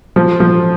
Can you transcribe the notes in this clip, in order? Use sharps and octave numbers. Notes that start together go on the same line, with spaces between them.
F3
F3